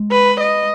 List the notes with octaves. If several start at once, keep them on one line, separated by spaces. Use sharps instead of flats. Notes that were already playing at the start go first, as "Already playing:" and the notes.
Already playing: G#3
B4
D#5